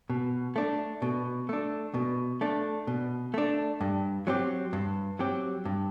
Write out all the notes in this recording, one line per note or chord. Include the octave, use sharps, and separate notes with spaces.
B2
A3 D4
B2
A3 D4
B2
A3 D4
B2
A3 D4
G2
F#3 C4 G4
G2
F#3 C4 G4
G2